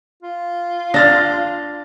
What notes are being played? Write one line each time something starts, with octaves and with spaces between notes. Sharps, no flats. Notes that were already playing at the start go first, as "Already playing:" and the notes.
F4
D4 F5 F6 A6 A#6